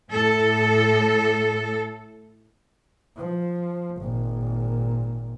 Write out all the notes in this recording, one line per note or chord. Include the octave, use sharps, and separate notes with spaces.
A2 A4
F3
G#1 A#2